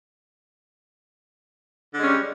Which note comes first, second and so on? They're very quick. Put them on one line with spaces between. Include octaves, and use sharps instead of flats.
D3 G#3 C#4 G3